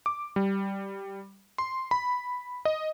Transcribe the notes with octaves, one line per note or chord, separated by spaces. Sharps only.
D6
G3
C6
B5
D#5